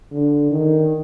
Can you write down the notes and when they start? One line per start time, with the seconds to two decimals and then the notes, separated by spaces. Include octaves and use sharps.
0.12 D3
0.50 D#3